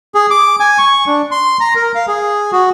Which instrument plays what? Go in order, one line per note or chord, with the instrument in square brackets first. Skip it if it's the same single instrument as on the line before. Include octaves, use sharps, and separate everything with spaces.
[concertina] G#4
D6
G#5
C#6
D4
C6
A#5
A#4
F5
G#4
F#4